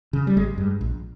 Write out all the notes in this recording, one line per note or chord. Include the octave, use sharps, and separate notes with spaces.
C#3
G3
G#1 G#3
G2
A#1